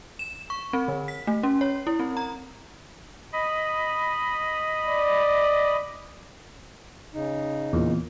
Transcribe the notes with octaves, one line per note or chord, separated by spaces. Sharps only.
E7
C#6
C4
D3
B6
A3
C#4
C#5
E4
C4
A#5
D#5 B5
D5
C#3 D#4
E2 A#2